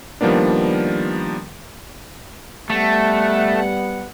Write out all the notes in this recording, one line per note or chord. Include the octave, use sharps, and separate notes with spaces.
D#3 F3 G3 A#3 B3 D4
G3 A3 B3 F#5